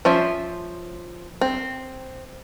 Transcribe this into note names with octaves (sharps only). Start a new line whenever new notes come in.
F3 C#4 C5 E5
C4